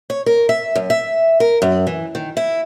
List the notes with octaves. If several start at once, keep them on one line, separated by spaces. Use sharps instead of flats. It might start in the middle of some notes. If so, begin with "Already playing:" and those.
C#5
A#4
E5
F#2
E5
A#4
F#2
E3
D#3
E4